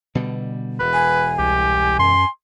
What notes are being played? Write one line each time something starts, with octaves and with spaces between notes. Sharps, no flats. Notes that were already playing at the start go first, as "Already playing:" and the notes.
B2 D3 G3
E1 B4
G#5
C2 G4
F#2 C6